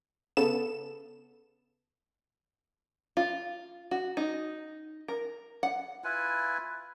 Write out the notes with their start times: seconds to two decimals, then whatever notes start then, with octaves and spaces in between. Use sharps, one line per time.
0.37 C#3 B3 A4 E7
3.17 F4
3.91 F#4
4.17 D#4
5.08 A#4
5.63 F#5
6.04 E4 F4 B4 G#5